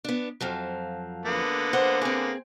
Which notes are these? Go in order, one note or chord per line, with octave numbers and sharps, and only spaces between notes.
B3 D4
F2 F3 F#3
D3 A#3 B3
C5 F#5
C4 G#4